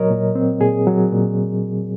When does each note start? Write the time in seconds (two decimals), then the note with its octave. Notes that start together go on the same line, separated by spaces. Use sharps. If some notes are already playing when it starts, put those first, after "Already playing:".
Already playing: A#2 F#3 A#4 C#5 D#5
0.11 A#2
0.35 C4
0.61 A#2 G#4
0.87 F#3
1.12 A#2